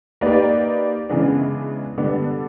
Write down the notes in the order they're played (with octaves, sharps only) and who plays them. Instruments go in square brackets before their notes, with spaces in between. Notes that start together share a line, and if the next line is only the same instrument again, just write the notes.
[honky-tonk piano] A#3 D#4 G4 B4 D5
C#3 E3 G#3 B3 D4
D3 G3 B3 D4